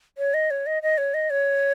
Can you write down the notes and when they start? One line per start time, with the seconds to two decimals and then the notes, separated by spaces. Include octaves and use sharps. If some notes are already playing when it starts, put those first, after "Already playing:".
0.18 C#5
0.34 D#5
0.51 C#5
0.66 D#5
0.83 D#5
0.98 C#5
1.14 D#5
1.30 C#5